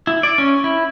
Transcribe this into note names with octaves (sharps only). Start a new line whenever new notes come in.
E4
D5
C#4
E4